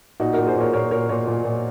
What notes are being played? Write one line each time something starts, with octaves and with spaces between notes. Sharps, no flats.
A#2 D#4 F#4
A#2 F#4 A#4
G#4 C5
A#2 A#4 C#5
A#2 A#4 C#5
A#2 A#4 C#5
A#2 A#4 C#5
A#2
A#2